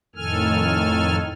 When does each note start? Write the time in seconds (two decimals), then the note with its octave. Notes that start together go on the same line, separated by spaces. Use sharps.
0.16 F2 A2 D#3 A4 G#5 F6